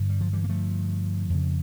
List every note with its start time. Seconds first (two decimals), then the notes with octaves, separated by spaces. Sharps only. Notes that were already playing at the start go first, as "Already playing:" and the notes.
Already playing: G2 D3
0.10 G3
0.21 F3
0.33 E3 G3
0.44 A#3
0.49 F3 A3
1.30 F2 C#3